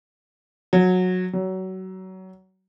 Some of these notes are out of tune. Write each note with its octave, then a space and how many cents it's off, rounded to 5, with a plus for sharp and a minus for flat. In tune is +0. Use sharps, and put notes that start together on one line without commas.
F#3 -15
F#3 +25